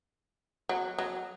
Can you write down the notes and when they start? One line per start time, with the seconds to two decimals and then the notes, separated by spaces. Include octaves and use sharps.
0.69 F#3
0.98 F#3